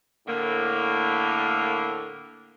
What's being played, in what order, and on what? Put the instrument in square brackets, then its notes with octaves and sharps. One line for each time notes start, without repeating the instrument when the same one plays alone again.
[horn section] A2 D3 A#3